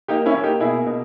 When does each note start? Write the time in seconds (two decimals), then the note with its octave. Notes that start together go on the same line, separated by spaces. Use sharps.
0.08 A#3 D#4 G4
0.26 C#4 E4
0.34 A#3
0.43 D#4 G4
0.60 B2 E4 G#4
0.86 B2